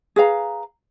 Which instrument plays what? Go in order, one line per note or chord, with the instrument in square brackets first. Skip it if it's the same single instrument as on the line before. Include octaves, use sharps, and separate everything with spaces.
[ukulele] G#4 B4 F5 A#5